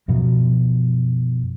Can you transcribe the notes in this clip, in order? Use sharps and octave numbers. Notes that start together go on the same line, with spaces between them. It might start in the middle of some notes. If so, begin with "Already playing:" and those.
F#2 B2 F3 F#3